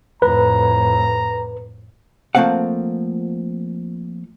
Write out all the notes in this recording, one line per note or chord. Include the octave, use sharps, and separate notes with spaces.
F2 A2 B4 A#5
F3 A3 A#3 C4 F5 F#5